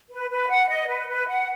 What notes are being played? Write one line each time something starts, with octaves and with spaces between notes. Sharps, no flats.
B4
B4
F#5
D#5
B4
B4
F#5